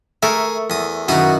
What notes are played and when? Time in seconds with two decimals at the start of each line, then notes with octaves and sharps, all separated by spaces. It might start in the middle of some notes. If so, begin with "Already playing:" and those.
0.23 A3 G#4 A#4 E5 C#6
0.70 E2 D#6
1.08 F#2 B2 D#3 E4 F#4 D#6